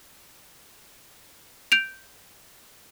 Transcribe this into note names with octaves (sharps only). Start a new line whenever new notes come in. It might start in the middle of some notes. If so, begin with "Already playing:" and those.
G6 D7 F7